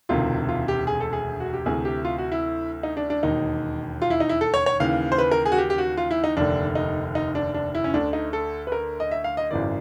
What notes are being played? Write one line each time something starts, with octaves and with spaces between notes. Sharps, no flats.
E1 D2 C3 D#3 F4
F4
G4
G#4
A4
G#4
F#4
G4
D2 C3 E3 G#4
G4
F4
F#4
E4
D#4
D4
D4
E1 D#2 D#3 D#4
F4
E4
D#4
E4
A4
C#5
C#5
D#2 C#3 E3 F5
C5
B4
A#4
G#4
F#4
G4
G4
F#4
F4
E4
D#4
F1 D#2 D3 D4
D#4
D#4
D4
D4
E4
C#4
D2 D3 D4
D#4
A4
B4
A#4
D#5
E5
F5
D#5
G#1 F#2 C#3 E3 D5